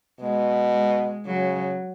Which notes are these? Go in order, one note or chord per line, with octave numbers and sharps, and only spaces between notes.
B2 G#3
G#3
C#3 F#3